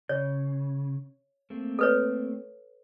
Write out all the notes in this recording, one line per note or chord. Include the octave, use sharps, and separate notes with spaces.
C#3 C#5
A3 A#3 C4
A4 B4 C#5